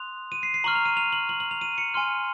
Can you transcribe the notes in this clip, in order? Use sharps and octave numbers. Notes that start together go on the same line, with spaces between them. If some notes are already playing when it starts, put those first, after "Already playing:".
Already playing: C6 D#6 F#6 F7
D#7
C7
C7
A#5 C#6 F6 F#7
F7
D#7
F7
F#7
F#7
F#7
F7
D#7
C#7
G#5 C6 F6